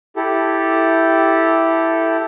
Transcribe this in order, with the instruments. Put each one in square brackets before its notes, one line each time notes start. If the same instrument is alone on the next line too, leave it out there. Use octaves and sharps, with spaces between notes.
[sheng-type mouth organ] E4 G4 A4